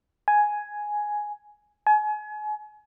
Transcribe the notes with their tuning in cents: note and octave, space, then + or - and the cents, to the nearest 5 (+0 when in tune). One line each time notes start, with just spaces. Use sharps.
G#5 +5
G#5 +35